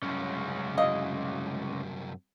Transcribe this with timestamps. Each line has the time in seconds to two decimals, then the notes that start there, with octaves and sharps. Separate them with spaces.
0.03 C2 F#2 C#3 G#3 C#4
0.78 E4 F#4 D#5 F5